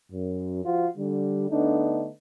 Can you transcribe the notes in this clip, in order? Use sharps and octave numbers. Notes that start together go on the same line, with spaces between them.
F#2
F3 F4 F#4
D3 G3
D3 A3 B3 D4 D#4